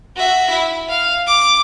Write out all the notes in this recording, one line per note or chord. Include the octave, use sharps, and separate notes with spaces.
F#4 E5
E4
F5
D6